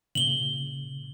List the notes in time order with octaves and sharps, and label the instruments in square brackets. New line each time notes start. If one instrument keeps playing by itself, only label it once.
[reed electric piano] A#2 C#3 [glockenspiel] F#7 G7